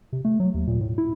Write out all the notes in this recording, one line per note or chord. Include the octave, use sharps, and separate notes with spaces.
C3
A3
F#3
D#2
A#2
A2
E4